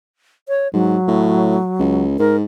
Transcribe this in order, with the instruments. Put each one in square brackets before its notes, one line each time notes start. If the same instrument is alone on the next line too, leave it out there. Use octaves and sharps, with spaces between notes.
[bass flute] C#5
[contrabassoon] G#2 [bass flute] F#3
[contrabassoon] A2
C#2
[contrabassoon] G#2 [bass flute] A#4